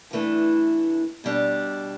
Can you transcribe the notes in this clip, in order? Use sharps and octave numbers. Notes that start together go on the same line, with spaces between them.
G2 E3 A3 D4
B2 G3 D4